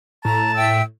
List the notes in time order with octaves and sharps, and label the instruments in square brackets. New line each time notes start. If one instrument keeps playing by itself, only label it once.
[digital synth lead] A2 [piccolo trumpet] A5 [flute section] A#5
[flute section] E5 G5 E6